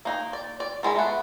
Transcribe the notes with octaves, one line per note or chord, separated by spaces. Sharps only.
A#3 D#4
D5
D5
D#3 G#3 G#4 B5
A3 B3